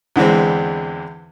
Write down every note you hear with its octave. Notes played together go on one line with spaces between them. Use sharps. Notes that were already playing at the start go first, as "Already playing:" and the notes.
E2 D3 E3 G#3 C4